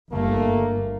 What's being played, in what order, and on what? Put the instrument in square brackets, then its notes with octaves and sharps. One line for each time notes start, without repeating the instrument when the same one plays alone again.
[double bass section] G1 [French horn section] A3 A#3